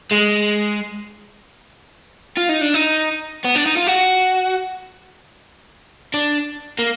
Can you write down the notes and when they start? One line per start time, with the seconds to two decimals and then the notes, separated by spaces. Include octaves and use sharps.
0.11 G#3
2.37 F4
2.49 D#4
2.61 D4
2.74 D#4
3.45 B3
3.56 D4
3.66 D#4
3.77 F4
3.87 F#4
6.14 D4
6.79 A#3